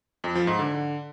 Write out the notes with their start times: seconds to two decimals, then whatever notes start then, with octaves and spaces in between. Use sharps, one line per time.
0.24 F2
0.35 F3
0.47 G#2
0.59 D3